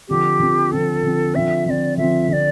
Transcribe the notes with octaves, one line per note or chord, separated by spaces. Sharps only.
D3 F3 C4 G4
D3 F3 C4
D3 F3 C4 A4
D3 F3 C4
D3 F3 C4 E5
D3 F3 C4 D5 E5
D3 F3 C4 E5
D3 F3 C4 D5 E5